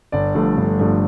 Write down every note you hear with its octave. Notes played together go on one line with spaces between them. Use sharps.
G1 D5
G2 F3 A3
G1
G2 F3 A3